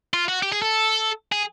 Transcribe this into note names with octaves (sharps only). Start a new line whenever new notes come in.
F4
F#4
G4
G#4
A4
G#4